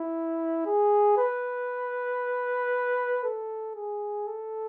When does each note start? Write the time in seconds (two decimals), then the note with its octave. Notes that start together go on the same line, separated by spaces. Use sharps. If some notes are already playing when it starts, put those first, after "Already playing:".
Already playing: E4
0.66 G#4
1.18 B4
3.24 A4
3.76 G#4
4.27 A4